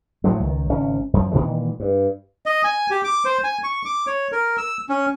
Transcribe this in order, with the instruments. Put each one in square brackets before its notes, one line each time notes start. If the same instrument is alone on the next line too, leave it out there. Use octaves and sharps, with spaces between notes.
[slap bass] A2 F3 F#3 G#3
C#2 D#3
G#1 C#3 C#4
F#2 F3
A#2 D#3 E3 G#3
G2
[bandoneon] D#5
G#5
G4
D6
C5
G#5
C#6
D6
C#5
A#4
E6
C#4